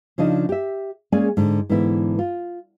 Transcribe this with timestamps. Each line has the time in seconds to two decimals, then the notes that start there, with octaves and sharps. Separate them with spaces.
0.18 C#3 F3 D4 D#4 D#5
0.49 G4 E5
1.12 G#3 A#3 C#4 G#4 D5 G#5
1.37 G#2 D3
1.69 G#2 D3 E3 B3 E4
2.19 F4